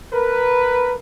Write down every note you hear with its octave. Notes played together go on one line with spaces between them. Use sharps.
A#4 B4